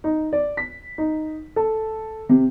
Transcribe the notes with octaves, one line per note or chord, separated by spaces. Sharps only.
D#4
D5
B6
D#4
A4
C3